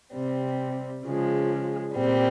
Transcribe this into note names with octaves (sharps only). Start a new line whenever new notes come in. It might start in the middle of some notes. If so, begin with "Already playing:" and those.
C3 G3 C4
C#3 F3 G#3
A#2 G3 C4